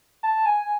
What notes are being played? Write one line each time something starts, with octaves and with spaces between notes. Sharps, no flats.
A5
G#5